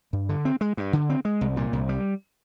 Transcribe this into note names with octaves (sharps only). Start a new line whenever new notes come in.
G2
D3
C4
G#3
G2
D3
C4
G#3
C2
A#2
C2
G3